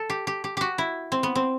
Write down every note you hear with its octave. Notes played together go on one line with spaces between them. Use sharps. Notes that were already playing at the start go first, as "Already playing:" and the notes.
Already playing: A4
G4
G4
G4
F#4 G4
E4
C4
B3
C4